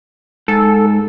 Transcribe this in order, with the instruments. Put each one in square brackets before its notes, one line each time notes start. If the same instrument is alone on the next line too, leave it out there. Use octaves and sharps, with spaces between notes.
[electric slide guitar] G#2 [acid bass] A4